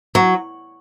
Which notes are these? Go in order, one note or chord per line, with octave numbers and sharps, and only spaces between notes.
F#3